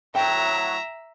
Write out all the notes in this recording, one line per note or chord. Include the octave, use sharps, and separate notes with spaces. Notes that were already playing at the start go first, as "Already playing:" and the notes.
A2 F#3 E5 G5 A#5